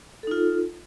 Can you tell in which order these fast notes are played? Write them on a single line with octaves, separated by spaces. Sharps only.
A4 D#4 F4